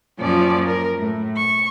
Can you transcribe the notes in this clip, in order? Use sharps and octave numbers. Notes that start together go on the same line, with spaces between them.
F#2 A#2 F3 C#4 D5
A#4
A2
C#6